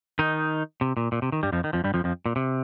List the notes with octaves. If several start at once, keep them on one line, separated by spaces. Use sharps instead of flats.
D#3 D#4
C3
A#2
A#2
C3
D#3
G2 G3
F2 F3
D#3
F2 F3
G2 G3
F2 F3
F2 F3
A#2
C3